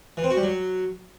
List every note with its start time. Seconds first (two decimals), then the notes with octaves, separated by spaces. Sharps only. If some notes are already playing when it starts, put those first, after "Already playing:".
0.17 E3
0.24 C4
0.30 F#4
0.37 G3
0.43 F#3